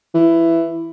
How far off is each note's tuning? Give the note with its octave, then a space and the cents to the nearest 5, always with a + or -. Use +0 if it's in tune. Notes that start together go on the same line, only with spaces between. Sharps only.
E3 +10